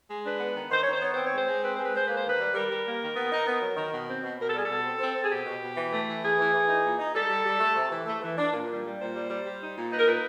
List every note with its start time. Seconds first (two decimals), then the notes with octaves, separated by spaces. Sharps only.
0.09 G#3
0.24 D4 B4
0.39 B3
0.55 D#3
0.71 D#3 C5
0.82 D#3 C#5
0.93 C5
1.01 B3 C#5
1.13 C4 C5
1.24 C#5
1.31 G#3 C5
1.47 G#3
1.62 C4 B4
1.74 G#3 C5
1.84 B4
1.93 G#3 C5
2.05 A#3 B4
2.16 C5
2.24 D#3 B4
2.39 G3
2.54 G3 A#4
2.70 G3
2.85 A#3
3.01 D#3
3.16 B3
3.32 D#4
3.47 B3
3.62 F#3
3.77 D#3
3.92 B2
4.08 C4
4.23 B2
4.39 B2 A#4
4.47 A4
4.54 G3 G#4
4.63 A4
4.69 B2
4.85 C4
5.00 C4
5.15 C4
5.22 G#4
5.30 B2 G4
5.46 B2
5.62 B2
5.77 E3
5.92 A3
6.07 E3
6.22 E3 G#4
6.39 E3
6.54 E3
6.68 D#4
6.84 A#2
6.99 D#4
7.14 G3 A4
7.30 G3
7.46 G3
7.61 A3
7.76 C3
7.91 E3
8.06 A3
8.22 E3
8.38 D4
8.53 A#2
8.69 G3
8.83 G3
8.99 A#2 C5
9.15 G3
9.30 G3
9.45 G3
9.61 D#4
9.75 A#2
9.91 D#4 B4
9.98 A#4
10.06 A#2 B4